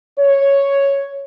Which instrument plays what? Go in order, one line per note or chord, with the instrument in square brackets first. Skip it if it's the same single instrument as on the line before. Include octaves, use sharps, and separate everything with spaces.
[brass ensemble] C#5